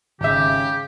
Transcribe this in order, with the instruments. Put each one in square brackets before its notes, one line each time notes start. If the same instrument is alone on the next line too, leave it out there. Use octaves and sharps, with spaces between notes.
[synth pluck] G#1 E5 [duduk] C#3 [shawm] G4